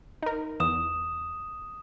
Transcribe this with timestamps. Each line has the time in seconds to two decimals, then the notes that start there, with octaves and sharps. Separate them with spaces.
0.23 D#4 A#4
0.60 E2 D#6 E7